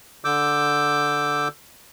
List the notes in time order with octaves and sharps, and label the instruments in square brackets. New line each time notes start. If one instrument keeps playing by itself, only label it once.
[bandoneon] D3 D6 E6 G6